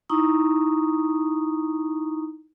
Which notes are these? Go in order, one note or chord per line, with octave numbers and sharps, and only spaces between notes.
D#4 E4 A#5 C#6 D#6